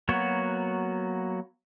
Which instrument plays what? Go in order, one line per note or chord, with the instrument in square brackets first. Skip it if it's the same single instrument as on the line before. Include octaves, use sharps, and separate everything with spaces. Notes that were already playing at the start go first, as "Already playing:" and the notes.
[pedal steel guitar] F#3 A#3 B3 F#4 C#5